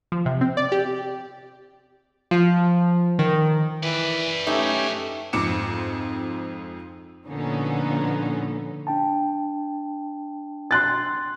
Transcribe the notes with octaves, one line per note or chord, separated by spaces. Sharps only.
F3
C3
C4
D5
G4
F3
D#3
E3 B4 D5
A3 C#4 D#4 G4 E5
F2 G#2 C4 D6 C#7 E7
A#2 D3 F3 B3 C#4 D#4
D4 G5 A5
C6 F#6 A6